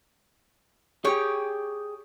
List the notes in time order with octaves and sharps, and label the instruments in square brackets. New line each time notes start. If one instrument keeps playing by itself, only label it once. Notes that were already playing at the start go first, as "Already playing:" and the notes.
[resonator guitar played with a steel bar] G4 C#5 [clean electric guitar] G#4 G5